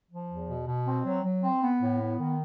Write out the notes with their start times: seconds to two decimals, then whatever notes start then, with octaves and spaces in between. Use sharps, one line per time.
0.10 F3
0.29 E2
0.48 B2
0.67 B2
0.87 C4
1.05 F#3
1.24 F#3
1.43 C4
1.62 B3
1.81 A2
2.01 B3
2.20 D#3